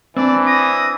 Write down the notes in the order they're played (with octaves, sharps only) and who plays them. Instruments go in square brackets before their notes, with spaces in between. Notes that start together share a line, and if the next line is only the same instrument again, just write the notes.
[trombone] E3 [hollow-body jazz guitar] C4 D4 [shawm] D5
[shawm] D#6 [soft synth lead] A#6